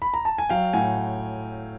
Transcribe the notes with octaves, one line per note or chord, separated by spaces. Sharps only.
B5
A#5
A5
G#5
F#3 F5 G5
A2 F#5 G#5